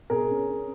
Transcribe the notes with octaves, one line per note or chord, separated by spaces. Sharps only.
B2 G#4 A#4
C#4
C#4